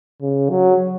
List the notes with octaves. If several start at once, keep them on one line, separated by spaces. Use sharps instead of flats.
C#3
F#3